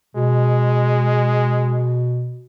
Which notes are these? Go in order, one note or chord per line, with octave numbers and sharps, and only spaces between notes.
B2 G#3